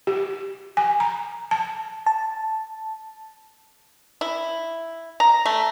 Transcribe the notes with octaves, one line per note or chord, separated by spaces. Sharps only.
G4
G#5
A#5
A5
A5
E4
A#5
A3